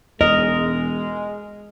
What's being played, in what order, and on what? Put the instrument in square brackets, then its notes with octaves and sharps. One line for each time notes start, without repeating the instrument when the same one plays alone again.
[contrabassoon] E1 [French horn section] G#3 [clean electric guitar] A#4 [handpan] D#5